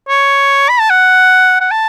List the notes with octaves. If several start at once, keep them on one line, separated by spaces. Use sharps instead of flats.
C#5
B5
A5
F#5
F#5
A5